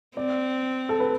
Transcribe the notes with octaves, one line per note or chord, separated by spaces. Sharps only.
C4 D5
A4
B4